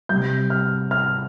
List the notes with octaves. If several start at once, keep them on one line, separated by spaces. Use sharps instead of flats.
C3 G3 G6
F6
F6